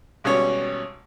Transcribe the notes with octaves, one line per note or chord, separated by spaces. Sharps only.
G#1 B2 G3 C#4 C#5